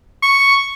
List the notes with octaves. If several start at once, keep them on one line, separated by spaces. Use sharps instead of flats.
C#6